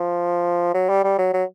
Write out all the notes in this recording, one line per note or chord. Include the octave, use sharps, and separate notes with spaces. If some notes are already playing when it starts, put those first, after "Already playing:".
Already playing: F3
F#3
G3
G3
F#3
F#3